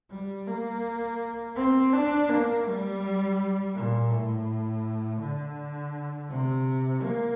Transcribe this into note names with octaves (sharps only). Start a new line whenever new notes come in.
G3
A#3
C4
D4
A#3
G3
A#2
A2
D3
C3
A#3